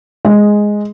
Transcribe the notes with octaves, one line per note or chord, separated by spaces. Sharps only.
G#3